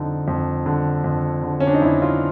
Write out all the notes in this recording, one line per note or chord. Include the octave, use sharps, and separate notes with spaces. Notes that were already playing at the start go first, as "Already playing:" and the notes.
Already playing: F2 D3 D#4
F2
D3
F2
D3
C#4
D4
D#4
F2 E4
F4